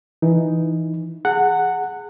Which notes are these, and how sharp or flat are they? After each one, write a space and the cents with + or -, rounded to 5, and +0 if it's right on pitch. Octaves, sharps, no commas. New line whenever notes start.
E3 +0 D#4 +0
G#4 +0 F#5 +0 A#5 -45